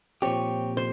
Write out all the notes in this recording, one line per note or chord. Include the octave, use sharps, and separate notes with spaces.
A#2 F3 C4 G4 C#5
C5